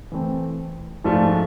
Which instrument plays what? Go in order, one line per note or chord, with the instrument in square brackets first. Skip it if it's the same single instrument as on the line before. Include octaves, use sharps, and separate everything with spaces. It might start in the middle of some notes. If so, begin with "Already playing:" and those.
[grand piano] E3 A3 C4
G#2 F3 A3 D4 F4